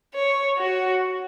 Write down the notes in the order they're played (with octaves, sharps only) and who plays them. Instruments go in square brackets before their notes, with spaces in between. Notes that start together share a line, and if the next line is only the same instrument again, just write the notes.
[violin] C#5
F#4